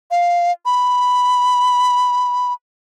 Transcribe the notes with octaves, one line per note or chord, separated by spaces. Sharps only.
F5
B5